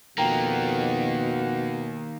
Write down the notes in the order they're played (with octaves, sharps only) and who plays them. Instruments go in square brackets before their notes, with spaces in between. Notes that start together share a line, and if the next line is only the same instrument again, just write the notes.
[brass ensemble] F2 F#4 F#5 [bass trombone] B2 [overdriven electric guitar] D#3 A#3 [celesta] G5 A#5